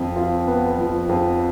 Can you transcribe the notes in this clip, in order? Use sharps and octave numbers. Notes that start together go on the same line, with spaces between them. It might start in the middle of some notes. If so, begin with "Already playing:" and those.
Already playing: F2 F3
F4
B3
F3
F2